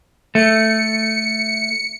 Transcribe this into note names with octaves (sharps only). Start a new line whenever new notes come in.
A3 C#7